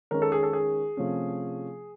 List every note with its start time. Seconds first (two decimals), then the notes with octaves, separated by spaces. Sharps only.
0.11 D#3 G#3 C#4 A#4
0.22 A4
0.32 G#4
0.43 A4
0.53 G#4
0.97 C3 F3 A3 C#4